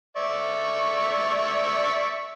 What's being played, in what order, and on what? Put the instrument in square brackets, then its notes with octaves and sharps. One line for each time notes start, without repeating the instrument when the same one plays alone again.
[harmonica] D5 E5 C#6